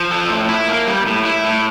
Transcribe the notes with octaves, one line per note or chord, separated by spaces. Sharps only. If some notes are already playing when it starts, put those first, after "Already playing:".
Already playing: F3
A4
A2
E4
A#3
G3
A2
E4
A2